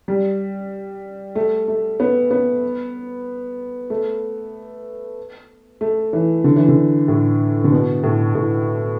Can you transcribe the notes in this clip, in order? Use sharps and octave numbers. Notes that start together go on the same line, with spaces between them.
G3
A3
A3
B3
B3
A3
A3
E3
D3
E3
D3
A2
D3
B2
A2
A2